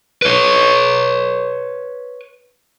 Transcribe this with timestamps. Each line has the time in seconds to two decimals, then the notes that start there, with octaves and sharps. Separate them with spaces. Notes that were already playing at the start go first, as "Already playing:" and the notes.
0.22 B4 C#5